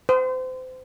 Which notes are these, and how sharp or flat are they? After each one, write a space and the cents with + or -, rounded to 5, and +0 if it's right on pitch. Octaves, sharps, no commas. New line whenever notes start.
C5 -30